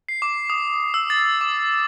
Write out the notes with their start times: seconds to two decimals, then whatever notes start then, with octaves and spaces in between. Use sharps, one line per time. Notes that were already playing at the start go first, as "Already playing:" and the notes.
0.09 C7
0.22 D6
0.50 D#6
0.94 E6
1.10 A6
1.41 D6